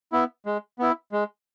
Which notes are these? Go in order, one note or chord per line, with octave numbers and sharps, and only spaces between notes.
B3 E4
G#3
B3 E4
G#3